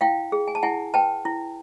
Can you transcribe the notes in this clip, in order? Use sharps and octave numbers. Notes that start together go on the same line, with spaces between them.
E4 F5 G5
G#4
G#5
A5
E4 F#5 G#5
B4 G5 A5
E4